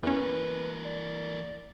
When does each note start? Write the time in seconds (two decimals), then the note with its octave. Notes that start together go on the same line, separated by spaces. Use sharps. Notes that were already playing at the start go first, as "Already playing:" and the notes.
0.03 E2 E3 A#3 C#4 B4
0.85 D5